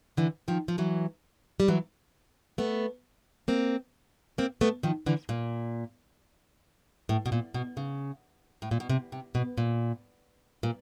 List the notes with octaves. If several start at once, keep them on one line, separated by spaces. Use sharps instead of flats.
D3 E3
D#3 F3
F3
E3 F#3
G3
E3 F#3
A3 B3
A#3 C4
A#3 C4
A3 B3
D#3 F3
D3 E3
A#2
A2
B2
A#2
B2
C#3
A2
A#2
B2
C3
C3
B2
A#2
A#2